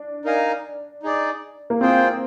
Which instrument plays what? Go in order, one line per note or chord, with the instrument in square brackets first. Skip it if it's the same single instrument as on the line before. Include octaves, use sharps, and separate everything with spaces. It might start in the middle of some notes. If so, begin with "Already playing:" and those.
Already playing: [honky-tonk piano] D4
[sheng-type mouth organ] D#4 A#4 F5 G#5
D#4 G#4 D5
[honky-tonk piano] A#3
[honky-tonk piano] C4 [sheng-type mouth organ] F4 G#4 C5 G5